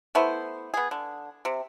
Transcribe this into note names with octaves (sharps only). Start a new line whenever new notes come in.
A3 B3 E4 C5
B3 G#4
D3
C3